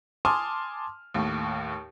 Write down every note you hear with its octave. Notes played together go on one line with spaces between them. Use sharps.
G#5 A5 C6 D6 D#6 F6
D#2 A2